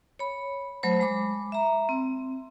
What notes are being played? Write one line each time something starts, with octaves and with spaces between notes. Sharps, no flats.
C#5 B5
F#3 A3 C5 B5
G#3 B5 D6
E5 A#5
C4